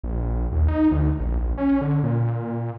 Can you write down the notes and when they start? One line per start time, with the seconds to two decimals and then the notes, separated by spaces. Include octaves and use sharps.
0.04 A#1
0.52 D#2
0.68 D#4
0.92 D2
1.20 A#1
1.58 C#4
1.81 D3
2.03 A#2